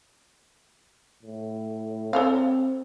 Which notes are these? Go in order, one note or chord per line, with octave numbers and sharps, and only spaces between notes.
A2
C4 A4 C#5 F5